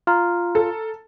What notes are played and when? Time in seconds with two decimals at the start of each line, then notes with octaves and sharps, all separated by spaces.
0.07 F4 A#5 F6
0.55 A4